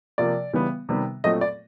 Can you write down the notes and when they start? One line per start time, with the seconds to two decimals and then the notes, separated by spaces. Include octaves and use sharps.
0.18 C3 F3 A#3 D5
0.53 C#3 E3 G3 B3
0.89 C3 D#3 G3 B3
1.24 A#2 F#3 A3 C4 D#5
1.41 D5